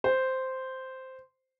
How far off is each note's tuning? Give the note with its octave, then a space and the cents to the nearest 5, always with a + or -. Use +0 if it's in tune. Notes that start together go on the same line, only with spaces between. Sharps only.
C5 -5